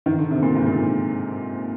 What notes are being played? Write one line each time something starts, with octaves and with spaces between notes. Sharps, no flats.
D#3
D3
C3
A#2
G#2
A#2